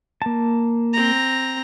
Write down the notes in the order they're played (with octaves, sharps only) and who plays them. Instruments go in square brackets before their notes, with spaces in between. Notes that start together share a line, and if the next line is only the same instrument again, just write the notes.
[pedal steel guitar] A#3 A5
[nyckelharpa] C4 A#5